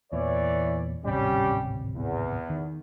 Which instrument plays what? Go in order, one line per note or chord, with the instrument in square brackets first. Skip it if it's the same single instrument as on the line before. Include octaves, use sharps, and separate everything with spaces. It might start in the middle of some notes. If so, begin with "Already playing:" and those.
[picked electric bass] E2 A#2 [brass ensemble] E3 C#5 D5
[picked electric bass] D1 G#1 C3 [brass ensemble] G3 C#4 G4
[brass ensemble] E2
[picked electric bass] D#3